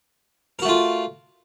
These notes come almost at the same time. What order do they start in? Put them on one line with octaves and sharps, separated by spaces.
A#4 F#4 A3 F4